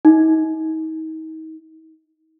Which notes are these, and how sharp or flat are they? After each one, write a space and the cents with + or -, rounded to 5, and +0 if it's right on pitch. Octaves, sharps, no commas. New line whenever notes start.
D#4 +35